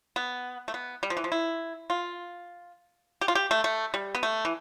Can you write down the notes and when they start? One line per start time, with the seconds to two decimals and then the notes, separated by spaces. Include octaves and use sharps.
0.16 B3
0.68 A3
0.74 B3
1.03 G3
1.10 F3
1.17 E3
1.24 F3
1.32 E4
1.90 F4
3.21 G4
3.28 F4
3.35 G4
3.51 A3
3.64 A3
3.94 G3
4.15 B3
4.23 A3
4.45 E3